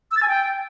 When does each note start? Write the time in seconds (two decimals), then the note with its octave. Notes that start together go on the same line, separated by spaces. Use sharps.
0.11 E6
0.17 A6
0.22 G#5
0.28 G5